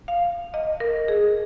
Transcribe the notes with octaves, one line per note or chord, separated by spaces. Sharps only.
F5
D#5
A#4
G#4